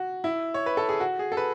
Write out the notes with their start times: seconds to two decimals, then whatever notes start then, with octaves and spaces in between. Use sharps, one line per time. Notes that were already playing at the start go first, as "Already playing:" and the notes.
Already playing: F#4
0.24 E4
0.54 C#5
0.66 B4
0.77 A4
0.89 G#4
1.00 F#4
1.19 G#4
1.32 A4
1.37 B4